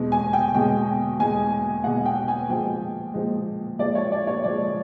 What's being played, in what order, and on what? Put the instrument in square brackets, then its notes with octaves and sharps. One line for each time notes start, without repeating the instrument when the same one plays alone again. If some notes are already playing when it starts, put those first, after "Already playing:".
Already playing: [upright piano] E2 B2 G#3
G#5
G5
E2 B2 G#3 G5
E2 B2 G#3 G#5
E2 B2 G#3 F#5
G5
G#5
A#2 F3 G#3 G5
A#2 F3 G#3
A#2 F3 G#3 D5
C#5
D5
C#5
A#2 F3 G#3 D5